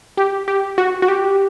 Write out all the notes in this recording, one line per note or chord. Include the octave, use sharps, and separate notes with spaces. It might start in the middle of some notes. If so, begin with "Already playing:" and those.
G4
G4
F#4
F#4
G4